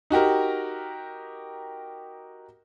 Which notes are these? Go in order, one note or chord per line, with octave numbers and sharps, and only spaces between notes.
D#4 F#4 G4 A#4